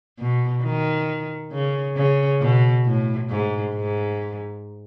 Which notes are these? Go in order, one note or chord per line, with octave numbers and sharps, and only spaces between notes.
B2
D#3
C#3
C#3
B2
A2
G#2
G#2